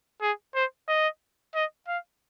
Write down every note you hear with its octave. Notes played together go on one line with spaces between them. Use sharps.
G#4
C5
D#5
D#5
F5